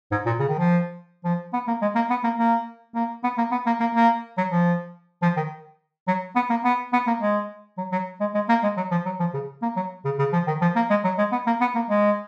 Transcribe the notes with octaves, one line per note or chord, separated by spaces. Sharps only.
G#2
A#2
C#3
D#3
F3
F3
B3
A#3
G#3
A#3
B3
A#3
A#3
A#3
B3
A#3
B3
A#3
A#3
A#3
F#3
F3
F3
D#3
F#3
B3
A#3
B3
B3
A#3
G#3
F#3
F#3
G#3
G#3
A#3
G#3
F#3
F3
F#3
F3
C#3
A#3
F#3
C#3
C#3
F3
D#3
F3
A#3
G#3
F#3
G#3
B3
A#3
B3
A#3
G#3